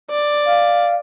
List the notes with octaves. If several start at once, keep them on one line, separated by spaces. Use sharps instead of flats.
D5
F5